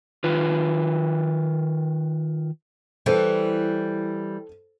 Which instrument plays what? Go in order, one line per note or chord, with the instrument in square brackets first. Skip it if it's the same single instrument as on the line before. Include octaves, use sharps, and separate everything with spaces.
[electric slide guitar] D#3 F4 B4
[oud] E3 G3 [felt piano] A4 C5